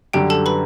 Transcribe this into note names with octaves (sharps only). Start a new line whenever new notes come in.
F#2 D3 G3 G4 G5
A4 A5
B4 B5